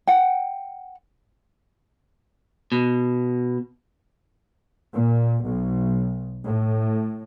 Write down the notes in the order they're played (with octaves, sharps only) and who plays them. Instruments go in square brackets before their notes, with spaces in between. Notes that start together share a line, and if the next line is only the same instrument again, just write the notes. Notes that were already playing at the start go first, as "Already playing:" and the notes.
[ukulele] F#5 G5
[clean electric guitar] B2
[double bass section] A#2
B1
A2